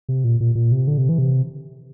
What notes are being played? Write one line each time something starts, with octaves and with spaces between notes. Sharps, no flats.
C3
A#2
A#2
A#2
C3
D3
C3
E3
C3